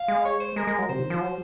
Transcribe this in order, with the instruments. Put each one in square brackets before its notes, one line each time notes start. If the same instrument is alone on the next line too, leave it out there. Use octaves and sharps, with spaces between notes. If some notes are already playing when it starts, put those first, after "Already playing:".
Already playing: [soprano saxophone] F5
[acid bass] G#3
[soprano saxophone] C#5
C5
[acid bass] G#3 [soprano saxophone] A#4
[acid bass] G#3
F#3
[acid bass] C3 [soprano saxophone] C5
[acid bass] D#3
F3
F#3